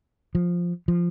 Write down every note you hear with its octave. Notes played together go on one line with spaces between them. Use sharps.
F3
F3